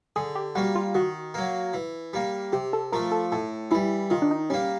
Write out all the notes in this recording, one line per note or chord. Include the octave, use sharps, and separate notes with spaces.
D3 G#4
G4
G3 A#3 F#4
F4
D#3 F#4
F#3 A#3
E3
G3 A#3
C3 G4
A4
F3 A3 A#4
A4
A2 A4
E3 G3 E4
D#3 F4
D4
D#4
G3 A#3 C#4